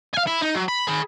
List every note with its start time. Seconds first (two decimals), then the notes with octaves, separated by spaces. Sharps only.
0.14 F5 G#5
0.27 E4
0.42 D#4
0.55 F#3
0.68 B5
0.88 G#4 B5